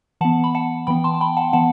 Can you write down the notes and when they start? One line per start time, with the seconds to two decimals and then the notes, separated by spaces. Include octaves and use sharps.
0.21 E3 B3 F#5 A5
0.44 B5
0.55 F#5 A5
0.87 E3 B3 G5 B5
1.04 A5 C6
1.15 A5
1.21 G5 B5
1.37 F#5 A5
1.53 E3 B3 F#5 A5